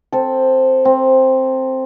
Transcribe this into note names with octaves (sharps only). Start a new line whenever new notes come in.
C4 A4
C4